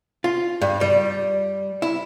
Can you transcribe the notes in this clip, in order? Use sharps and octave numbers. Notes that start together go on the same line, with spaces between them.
F4
G2
G3
E4